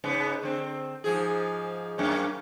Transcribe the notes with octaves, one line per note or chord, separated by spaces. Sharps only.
G#2 C#3 B3
D3 C4
G#2 F3 G#4
F#2 A#3 C#4